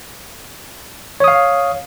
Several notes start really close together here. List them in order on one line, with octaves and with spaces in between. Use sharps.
C#5 D#6 F5